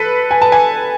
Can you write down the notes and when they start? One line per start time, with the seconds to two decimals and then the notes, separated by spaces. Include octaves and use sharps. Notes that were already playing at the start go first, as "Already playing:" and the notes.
Already playing: A4 B4
0.31 G#5
0.42 A5
0.52 G#5